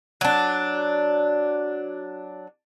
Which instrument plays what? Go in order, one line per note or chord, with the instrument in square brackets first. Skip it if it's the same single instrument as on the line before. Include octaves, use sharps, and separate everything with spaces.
[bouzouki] F#3 D4